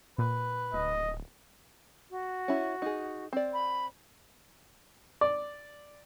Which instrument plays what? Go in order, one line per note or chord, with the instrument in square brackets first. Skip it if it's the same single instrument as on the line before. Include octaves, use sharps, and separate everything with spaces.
[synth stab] A#2 [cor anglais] B4
[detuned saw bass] D1 [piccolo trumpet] D#5
[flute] F#4
[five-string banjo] C#4 E4
D#4 G#4
C4 D5
[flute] B5
[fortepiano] D5